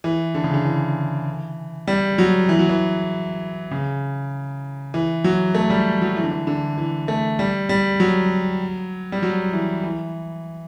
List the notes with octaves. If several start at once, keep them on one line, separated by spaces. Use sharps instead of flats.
E3
D3
C#3
D3
E3
G3
F#3
E3
F#3
E3
C#3
E3
F#3
A3
G3
F#3
E3
D3
E3
D3
E3
A3
G3
G3
F#3
G3
F#3
E3
E3